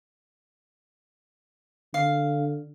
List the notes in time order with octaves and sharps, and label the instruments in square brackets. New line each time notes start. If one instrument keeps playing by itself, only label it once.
[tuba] D3 [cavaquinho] F5